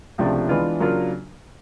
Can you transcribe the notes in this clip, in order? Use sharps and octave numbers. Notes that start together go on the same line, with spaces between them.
C#2 C3 F3 A3 D4
E3 G#3 B3 D4 F4
C#3 F#3 A#3 D4 F4